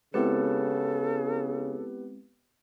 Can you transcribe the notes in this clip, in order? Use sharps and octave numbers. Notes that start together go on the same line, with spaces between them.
C#3 G#3 B3 C4 E4 G4 A4 B4